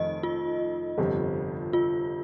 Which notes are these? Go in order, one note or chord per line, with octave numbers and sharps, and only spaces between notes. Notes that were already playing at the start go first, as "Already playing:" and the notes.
Already playing: F1 F2 D#3 D#5
F4
G1 F2 C3
F4